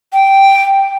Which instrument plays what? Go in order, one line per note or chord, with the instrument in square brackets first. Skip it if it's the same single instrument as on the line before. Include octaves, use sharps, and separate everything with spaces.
[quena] G5